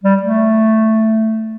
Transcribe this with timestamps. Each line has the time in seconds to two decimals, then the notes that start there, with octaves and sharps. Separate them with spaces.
0.03 G3
0.23 A3